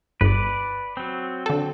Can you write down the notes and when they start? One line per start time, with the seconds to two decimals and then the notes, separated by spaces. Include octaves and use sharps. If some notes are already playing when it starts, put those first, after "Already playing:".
0.21 G1 B4 D5
0.97 F#3 C4
1.46 D3 A4